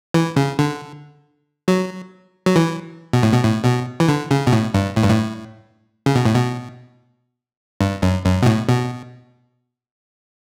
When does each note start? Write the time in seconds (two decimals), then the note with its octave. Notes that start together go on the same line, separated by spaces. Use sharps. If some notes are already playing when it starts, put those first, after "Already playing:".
0.14 E3
0.36 C#3
0.59 D3
1.68 F#3
2.46 F#3
2.56 E3
3.13 B2
3.23 A2
3.33 B2
3.44 A2
3.65 B2
4.00 E3
4.09 D3
4.31 C#3
4.47 B2
4.53 A2
4.74 G2
4.96 A2
5.04 G2
5.10 A2
6.06 C#3
6.15 B2
6.25 A2
6.35 B2
7.81 G2
8.02 F#2
8.24 F#2
8.43 B2
8.46 A2
8.68 B2